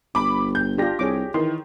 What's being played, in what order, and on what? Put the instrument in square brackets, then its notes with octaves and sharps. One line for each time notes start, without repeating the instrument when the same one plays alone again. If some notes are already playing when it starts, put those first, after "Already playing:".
[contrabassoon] G1 [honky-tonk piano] B5 D6
[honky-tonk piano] G6
[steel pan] D4 F4 [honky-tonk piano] G4 A#6
[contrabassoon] C2 [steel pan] G#4 C#5 D6
[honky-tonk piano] D#3 [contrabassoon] E3 [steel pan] C6